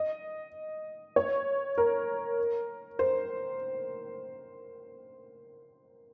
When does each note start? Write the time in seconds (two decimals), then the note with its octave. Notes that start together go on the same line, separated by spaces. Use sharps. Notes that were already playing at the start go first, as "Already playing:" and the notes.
Already playing: D#5
1.16 C#5
1.78 A#4
2.99 C5